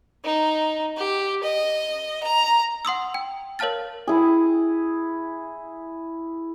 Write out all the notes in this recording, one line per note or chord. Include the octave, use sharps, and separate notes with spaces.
D#4
G4
D#5
A#5
F#5 C6 D#6 E6
G5
A#4 C#5 F5 A5 F6 A6
E4 G#4